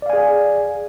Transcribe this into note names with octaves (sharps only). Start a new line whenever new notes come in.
G#4 D5 F5 G#5